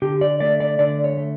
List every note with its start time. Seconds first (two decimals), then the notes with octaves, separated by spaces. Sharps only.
0.02 D3 G4
0.21 D5
0.40 A3 D5
0.60 D5
0.79 D3 D5
1.04 C#5
1.17 A3